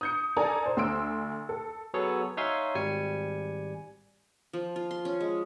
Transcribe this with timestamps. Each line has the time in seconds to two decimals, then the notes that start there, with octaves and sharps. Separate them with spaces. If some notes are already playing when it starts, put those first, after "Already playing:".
0.01 D#6 G6 C#7
0.37 A4 A#4 D5 G#5 A#5
0.66 C5
0.77 D2 C6 E6 D7
1.49 A4
1.94 F#3 B3 G#4 A4 C#5
2.37 D#4 C#5 E5 F5 G#5 C6
2.75 G#1 G3 G#5 C#7
4.53 F3
4.76 F4
4.91 C6
5.05 C#4
5.20 G#3